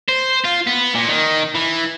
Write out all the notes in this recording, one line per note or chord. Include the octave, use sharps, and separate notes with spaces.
C5
F4
B3
A#2
D#3
E3